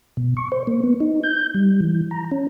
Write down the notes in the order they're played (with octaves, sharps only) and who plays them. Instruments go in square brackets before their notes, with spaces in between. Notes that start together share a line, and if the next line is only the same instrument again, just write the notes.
[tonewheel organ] B2
C#6
C5
A#3
B3
D#4
G6
G3
E3
A#5
C#4